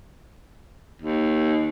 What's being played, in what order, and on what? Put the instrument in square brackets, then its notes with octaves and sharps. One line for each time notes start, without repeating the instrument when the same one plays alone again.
[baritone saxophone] D#2